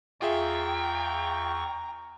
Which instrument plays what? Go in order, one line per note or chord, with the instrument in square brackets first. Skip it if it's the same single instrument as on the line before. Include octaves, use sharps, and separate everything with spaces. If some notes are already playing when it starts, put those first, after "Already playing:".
[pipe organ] E2 C#6 [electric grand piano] F4 G#4 E5 [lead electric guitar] G5 [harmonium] A#5